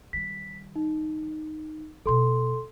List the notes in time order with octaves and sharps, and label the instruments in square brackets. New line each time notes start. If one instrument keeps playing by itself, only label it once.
[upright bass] D#3 G3 [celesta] B6
[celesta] D#4
[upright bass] B2 B3 [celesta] A4 C6